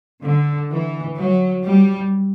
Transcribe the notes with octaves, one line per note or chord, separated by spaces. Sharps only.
D3
E3
F#3
G3